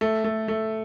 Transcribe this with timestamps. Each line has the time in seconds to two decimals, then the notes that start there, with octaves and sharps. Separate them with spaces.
0.01 A3
0.24 A3
0.48 A3